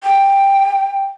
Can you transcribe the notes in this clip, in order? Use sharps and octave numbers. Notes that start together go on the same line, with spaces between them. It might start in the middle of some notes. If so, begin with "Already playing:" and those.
G5